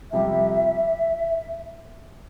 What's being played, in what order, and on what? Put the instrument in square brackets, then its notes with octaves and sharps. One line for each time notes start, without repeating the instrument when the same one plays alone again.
[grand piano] F2 C3 G3 [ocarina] E5